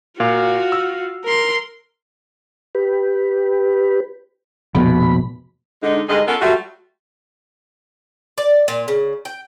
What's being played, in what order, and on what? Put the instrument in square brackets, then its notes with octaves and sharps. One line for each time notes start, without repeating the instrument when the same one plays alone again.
[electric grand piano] A#2 [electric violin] F4 F#4 [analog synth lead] F5
[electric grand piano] E6
[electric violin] A#4 C6
[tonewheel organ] G4 B4
[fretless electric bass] F1 A#1 B2 [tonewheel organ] B5
[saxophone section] D3 G#3 D#4
G2 D3 G#3 D#4 G#4 D#5
B3 C#4 F4 A4 A#4
F#3 G3 A3 F4 F#4
[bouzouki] D5
A#2
C#3
G5